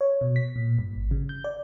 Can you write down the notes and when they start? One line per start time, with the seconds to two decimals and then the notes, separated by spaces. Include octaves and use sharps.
0.01 C#5
0.21 B2
0.36 B6
0.56 A#2
0.79 G2
0.95 G#1
1.11 C#3
1.29 G6
1.44 D5